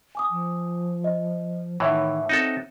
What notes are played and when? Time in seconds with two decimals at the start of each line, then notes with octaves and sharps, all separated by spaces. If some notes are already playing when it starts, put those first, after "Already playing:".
0.15 G#5 D6 D#6
0.31 F3
1.04 D#5
1.80 A2 D#3 E3 C#5 E5 F#5
2.29 C4 D#4 F#4 A4